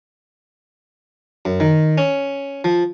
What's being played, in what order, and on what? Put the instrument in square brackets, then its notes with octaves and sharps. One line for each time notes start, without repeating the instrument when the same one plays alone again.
[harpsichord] F#2
D#3
C#4
F3